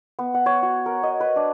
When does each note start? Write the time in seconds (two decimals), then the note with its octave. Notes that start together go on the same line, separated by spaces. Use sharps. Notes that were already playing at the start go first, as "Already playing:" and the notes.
0.19 B3
0.34 F#5
0.46 C#5
0.63 F#4
0.86 A#4
1.03 D#5
1.20 B4
1.36 D4